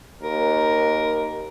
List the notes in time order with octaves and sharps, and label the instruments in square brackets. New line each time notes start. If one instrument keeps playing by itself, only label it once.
[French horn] D#2 [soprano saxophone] A#4